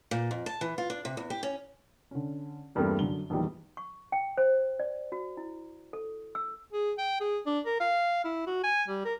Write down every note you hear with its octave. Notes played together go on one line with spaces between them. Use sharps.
A#2
F2
A5
E3
F4
D4
C3
E2
G4
C#4
D3 C#4
E2 G2 G3 A3 A#3 C4
F#2 D3 G7
A#1 E2 D#3 G3
C#6
G5
C5
D5
F#4
E4
A4
E6
G#4
G5
G#4
D4
A#4
F5
E4
F#4
G#5
G3
A#4